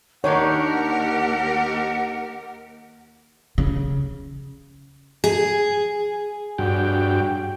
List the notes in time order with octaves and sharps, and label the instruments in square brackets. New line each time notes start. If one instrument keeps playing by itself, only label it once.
[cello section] D#2 G4 A#4 [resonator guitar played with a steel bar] D#3 D4 D#4 [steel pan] C#5 [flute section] F#5
[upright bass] C#3
[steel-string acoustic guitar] G#4
[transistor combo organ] G2 F#4 G5